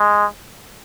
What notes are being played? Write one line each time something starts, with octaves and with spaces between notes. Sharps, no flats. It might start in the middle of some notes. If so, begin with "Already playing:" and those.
Already playing: G#3